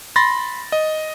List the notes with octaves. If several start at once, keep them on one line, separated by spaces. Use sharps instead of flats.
B5 C6 A6 A#6
D#5